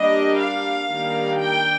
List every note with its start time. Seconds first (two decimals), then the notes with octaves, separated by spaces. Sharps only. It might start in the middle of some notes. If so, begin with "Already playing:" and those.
Already playing: G3 A#3 D4 D#5
0.38 F5
0.88 D#3 G3 A#3 D4
1.38 G5